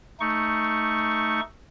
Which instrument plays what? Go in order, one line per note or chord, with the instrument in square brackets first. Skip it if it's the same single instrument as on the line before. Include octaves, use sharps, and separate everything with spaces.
[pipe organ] A3 D#4 C#6